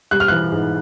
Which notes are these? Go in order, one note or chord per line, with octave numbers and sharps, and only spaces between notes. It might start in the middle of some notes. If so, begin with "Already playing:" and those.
G3 F#6
F6
E3 F#6
G#2